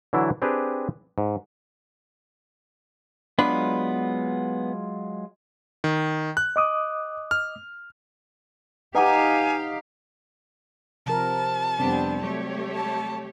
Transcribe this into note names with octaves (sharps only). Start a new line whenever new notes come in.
D3 E3 F#3 D4 E4
C4 D4 G4 G#4 B4
G#2
F#3 G#3 B3 D4 F4 B4
D#3
F#6
D#5 D6 D#6
F6
D#4 G4 B4 F5 F#5 G#5 D6
C3 F3 A#4 A5
F2 C3 G3 B3 C4 D4
F#3 A3 G4 C#5
A5